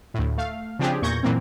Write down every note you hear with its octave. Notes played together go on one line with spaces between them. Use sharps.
D2 A2
A3 F5
C#3 F3 C4 D4 G4 G#4
E2 A#2 C#6 G6 G#6 A#6
F#2 A#2 E3 A#3 C4